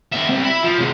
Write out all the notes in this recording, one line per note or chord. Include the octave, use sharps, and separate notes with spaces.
D#2 E5
C3 G3
E5 B5
F3
C3 G#3